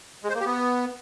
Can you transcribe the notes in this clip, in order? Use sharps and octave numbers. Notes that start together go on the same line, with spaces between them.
G#3
C5
A#3
G4
B3